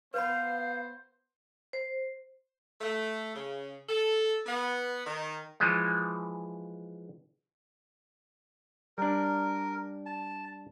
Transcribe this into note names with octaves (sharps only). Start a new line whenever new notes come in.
B3 B4 C5 F5 B5
C5
A3
C#3
A4
B3
D#3
E3 F3 G#3
G3 D4 A#4
A5